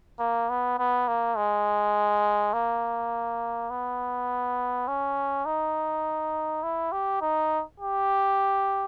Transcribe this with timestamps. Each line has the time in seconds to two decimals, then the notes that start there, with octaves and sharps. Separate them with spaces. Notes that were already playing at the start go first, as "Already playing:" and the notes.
0.19 A#3
0.49 B3
0.79 B3
1.08 A#3
1.37 G#3
2.53 A#3
3.70 B3
4.88 C#4
5.46 D#4
6.63 E4
6.92 G4
7.22 D#4
7.80 G4